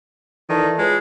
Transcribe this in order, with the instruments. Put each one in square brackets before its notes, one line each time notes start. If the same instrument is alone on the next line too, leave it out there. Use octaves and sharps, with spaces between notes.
[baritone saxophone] D#3 [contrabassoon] E3 [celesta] A4 D5 A5
[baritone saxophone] G#3 [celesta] F4 B4 C#5